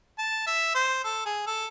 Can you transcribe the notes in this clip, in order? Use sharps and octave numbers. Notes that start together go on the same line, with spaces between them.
A5
E5
C5
A4
G#4
A4